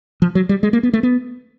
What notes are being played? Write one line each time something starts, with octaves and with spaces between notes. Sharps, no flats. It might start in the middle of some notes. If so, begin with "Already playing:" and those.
F3
F#3
G3
G#3
A#3
B3
A3
B3